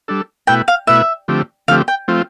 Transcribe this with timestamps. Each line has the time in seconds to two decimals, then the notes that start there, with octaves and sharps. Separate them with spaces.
0.08 G3 D4 A4
0.47 B2 A3 E4 B4 G5
0.68 F5
0.87 B2 A3 E4 B4 E5
1.28 D3 F3 A3 C4 G4
1.68 D3 F3 A3 C4 G4 F5
1.88 G5
2.08 F3 A3 C4 F4